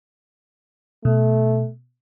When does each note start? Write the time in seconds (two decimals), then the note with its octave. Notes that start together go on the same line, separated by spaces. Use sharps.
1.05 B2 A3